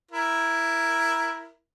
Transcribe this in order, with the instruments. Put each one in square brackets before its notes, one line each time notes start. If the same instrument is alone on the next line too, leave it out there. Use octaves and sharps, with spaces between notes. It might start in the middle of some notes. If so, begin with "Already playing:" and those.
[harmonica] E4 A#4